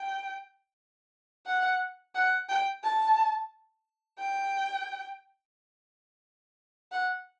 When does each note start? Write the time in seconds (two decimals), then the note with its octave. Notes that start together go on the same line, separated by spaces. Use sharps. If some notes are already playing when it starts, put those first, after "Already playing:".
Already playing: G5
1.46 F#5
2.15 F#5
2.49 G5
2.83 A5
4.19 G5
6.91 F#5